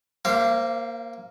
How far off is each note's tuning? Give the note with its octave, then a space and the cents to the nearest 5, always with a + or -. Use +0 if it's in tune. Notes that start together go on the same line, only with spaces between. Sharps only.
A#3 +0 C5 +10 F5 -40